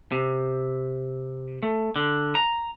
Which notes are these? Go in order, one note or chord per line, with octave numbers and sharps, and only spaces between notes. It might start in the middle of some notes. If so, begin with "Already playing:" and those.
C3
A3
D3
A#5